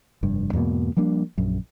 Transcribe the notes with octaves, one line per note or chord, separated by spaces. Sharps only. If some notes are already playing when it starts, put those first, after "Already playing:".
F1 G2
E2 G#2 B2 A#3
F3 G3 A#3 D4
A#1 F#2